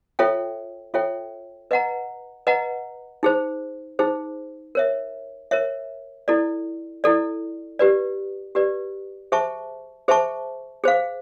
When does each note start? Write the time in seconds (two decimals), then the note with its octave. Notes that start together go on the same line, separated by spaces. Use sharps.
0.19 F4 A4 C#5 E5 G5
0.94 F4 A4 C#5 E5 G5
1.71 B4 D#5 F#5 A#5
2.47 B4 D#5 F#5 A#5
3.23 D#4 G#4 C5
3.99 D#4 G#4 C5
4.75 A#4 C#5 E5
5.51 A#4 C#5 E5
6.28 E4 A4 D5
7.04 E4 A4 D5
7.79 G4 B4 D5
8.55 G4 B4 D5
9.32 G#4 C5 E5 A5 C#6
10.08 G#4 C5 E5 A5 C#6
10.84 G#4 C5 F5